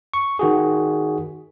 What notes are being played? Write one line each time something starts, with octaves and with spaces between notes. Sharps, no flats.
C#6
D#3 F#4 G#4